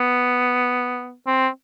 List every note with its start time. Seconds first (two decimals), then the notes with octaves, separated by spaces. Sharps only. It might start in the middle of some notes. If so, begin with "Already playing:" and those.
Already playing: B3
1.27 C4